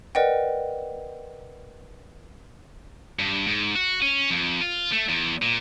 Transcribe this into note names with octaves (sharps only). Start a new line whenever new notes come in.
A#4 B4 D5 D#5 F#5 G5
G2
G#2
F#4
C#4
F2
F4
A3
E2
A#2